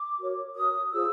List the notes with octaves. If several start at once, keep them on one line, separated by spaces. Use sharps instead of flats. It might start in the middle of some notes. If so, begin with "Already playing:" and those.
Already playing: D6
F#4 A#4 C#5
F#4 A#4 C#5 D#6
F4 G#4 C5 E6